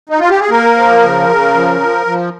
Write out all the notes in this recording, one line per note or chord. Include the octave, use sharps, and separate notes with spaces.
D#4
F4
G4
G#4
A#3 A#4
F3
C#3
C#3
F3
F3
F3